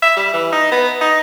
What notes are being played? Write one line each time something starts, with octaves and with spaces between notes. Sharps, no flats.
E5
G3
E3
D#4
B3
D#4